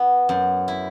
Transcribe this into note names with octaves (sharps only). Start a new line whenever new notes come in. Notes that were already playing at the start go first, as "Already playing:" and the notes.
Already playing: B3 E4
F#2
E4